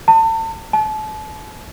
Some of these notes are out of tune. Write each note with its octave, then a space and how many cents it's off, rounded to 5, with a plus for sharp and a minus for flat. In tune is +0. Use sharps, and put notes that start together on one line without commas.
A5 +35
A5 -35